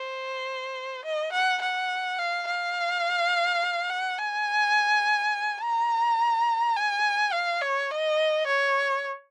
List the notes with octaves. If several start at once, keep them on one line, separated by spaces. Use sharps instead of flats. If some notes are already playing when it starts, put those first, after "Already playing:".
Already playing: C5
D#5
F#5
F#5
F5
F5
F#5
G#5
A#5
G#5
F5
C#5
D#5
C#5